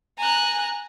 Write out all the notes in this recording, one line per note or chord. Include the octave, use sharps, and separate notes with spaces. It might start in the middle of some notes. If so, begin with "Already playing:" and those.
G#5 A#5 F#6